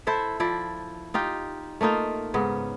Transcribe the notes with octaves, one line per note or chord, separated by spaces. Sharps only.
E4 A4 C5 E5
F3 E4 D5
D#4 F4 G4
A3 A#3 D#4 F4
G#2 C#3 B3